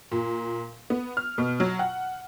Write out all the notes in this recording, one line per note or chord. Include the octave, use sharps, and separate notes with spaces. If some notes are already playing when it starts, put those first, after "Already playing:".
A#2
B3
F6
B2
F#3
F#5